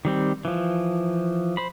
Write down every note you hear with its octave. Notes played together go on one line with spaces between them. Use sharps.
D#3 G3 C4
E3 F3
C5 B5